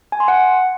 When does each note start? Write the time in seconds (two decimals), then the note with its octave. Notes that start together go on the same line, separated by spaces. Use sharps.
0.12 G#5
0.20 C6
0.28 F#5